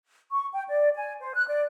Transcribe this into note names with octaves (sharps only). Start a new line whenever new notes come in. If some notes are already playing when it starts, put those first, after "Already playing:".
C#6
G5
D5
G#5
C5
F#6
D5